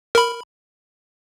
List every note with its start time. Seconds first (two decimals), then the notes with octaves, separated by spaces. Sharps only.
0.15 A#4 B5